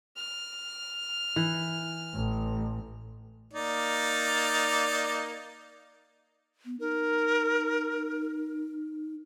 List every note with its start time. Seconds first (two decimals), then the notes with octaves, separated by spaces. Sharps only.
0.16 F6
1.36 E3
2.15 A1
3.53 A#3 D#4 D5
6.65 B3
6.80 D#4 A#4